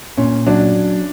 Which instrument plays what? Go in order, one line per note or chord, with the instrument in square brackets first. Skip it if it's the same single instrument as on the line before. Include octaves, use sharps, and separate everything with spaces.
[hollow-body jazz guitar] A#2 [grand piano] C#4
[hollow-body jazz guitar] F#3 [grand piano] D4